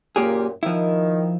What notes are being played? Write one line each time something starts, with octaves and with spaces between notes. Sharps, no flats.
F#2 A#2 A#3 G4 G#4
D#3 F3 E4